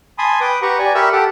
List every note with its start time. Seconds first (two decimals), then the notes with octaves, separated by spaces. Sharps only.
0.18 G#5 A5 B5 C6 D#6
0.41 B4 G5 D6 D#6
0.62 G4 B4 F#5 A#5 C#6
0.79 D5 G#5 A#5
0.95 G4 A#4 E5 B5 C#6 E6
1.12 G4 A4 F#5 D6